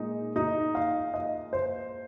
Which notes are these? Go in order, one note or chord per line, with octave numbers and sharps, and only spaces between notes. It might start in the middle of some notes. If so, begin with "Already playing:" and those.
Already playing: A#2 G#3 D#4
D#4
F5
D#5
C5